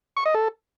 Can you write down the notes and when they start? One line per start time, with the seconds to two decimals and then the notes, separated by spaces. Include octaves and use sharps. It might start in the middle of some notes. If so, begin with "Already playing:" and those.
0.17 C#6
0.26 D#5
0.34 A4